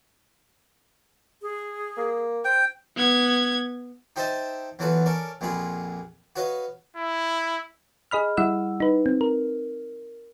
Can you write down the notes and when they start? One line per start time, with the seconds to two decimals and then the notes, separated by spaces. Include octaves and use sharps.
1.42 G#4
1.98 A#3
2.45 C5 G5
2.96 B3 G#6
4.16 D#4 G4 C5 D#5 E5 A5
4.79 E2 E3 F#3 F4 A4 B4
5.06 C#4 A4 A#4 D5
5.41 A#1 F2 A#2 F4 G#4 B5
6.36 F#4 B4 C#5 D#5 F5
6.96 E4
8.11 G#4 D#5 B5 F6
8.37 G3 E4 F#5 E6
8.80 D#4 B4
9.06 C4
9.21 A#4